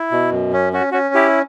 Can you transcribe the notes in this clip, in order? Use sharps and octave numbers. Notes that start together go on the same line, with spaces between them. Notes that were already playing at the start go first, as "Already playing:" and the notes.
Already playing: E4
B2
F#2
C#4
C#4 F#4
C#4 F#4
E4 G4